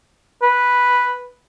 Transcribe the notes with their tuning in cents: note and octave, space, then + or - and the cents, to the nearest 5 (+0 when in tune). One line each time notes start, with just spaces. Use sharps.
B4 -5